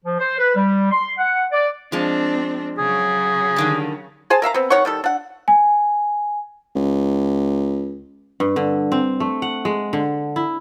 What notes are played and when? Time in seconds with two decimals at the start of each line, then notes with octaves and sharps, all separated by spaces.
0.05 F3
0.19 C5
0.39 B4
0.55 G3
0.92 C6
1.18 F#5
1.52 D5
1.92 F3 G#3 C4 D4
2.78 C#3 F#3 G#4
3.56 D3 D#3 G3
4.30 G#4 C5 G#5 A5
4.42 A#4 E5 F5 A#5
4.54 B3 C4
4.70 D#3 C#5 F#5 C#6
4.85 D#3 G3 A4
5.04 D4 F#5
5.48 G#5
6.76 C#2
8.40 G2
8.56 D3
8.92 C4
9.20 A3
9.42 F#5
9.65 G#3
9.93 D3
10.36 E4